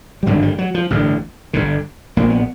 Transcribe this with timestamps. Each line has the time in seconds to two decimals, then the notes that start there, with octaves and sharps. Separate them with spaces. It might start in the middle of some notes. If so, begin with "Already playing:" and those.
0.23 G3
0.27 G#1 G2 D3 F#3
0.42 G3
0.58 F#3
0.75 F3
0.90 A1 G2 D3
1.53 G1 G2 D3
2.17 A#1 A#2 A#3
2.30 B3